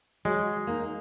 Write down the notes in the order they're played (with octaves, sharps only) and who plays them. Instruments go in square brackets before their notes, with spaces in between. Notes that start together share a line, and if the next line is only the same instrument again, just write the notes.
[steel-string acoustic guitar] F#3 [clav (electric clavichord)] G#3
[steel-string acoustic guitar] A#3 D#4